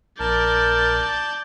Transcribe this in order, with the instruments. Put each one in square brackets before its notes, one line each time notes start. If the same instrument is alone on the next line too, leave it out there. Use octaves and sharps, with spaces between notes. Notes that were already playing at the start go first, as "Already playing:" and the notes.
[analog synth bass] A#1 [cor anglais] A#4 [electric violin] D5 G6 [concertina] A5